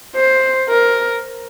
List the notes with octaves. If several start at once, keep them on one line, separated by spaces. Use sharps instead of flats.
C5
A#4